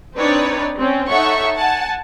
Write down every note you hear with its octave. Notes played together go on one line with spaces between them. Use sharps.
C4 D4 D#4 B4 C#5 D5
C4 C#4
D#4 A4 C#5 E5 F#5 C#6
F#5 G#5 A5